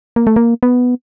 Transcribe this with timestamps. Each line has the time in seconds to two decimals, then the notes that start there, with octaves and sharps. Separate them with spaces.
0.16 A#3
0.27 A3
0.36 A#3
0.63 B3